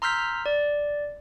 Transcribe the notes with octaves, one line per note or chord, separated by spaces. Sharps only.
A#5 C6 E6 F6 G6 B6
D5